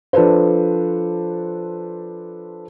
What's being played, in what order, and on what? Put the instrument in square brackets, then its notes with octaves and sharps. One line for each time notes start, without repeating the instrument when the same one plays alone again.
[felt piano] F3 D4 A4 B4 C5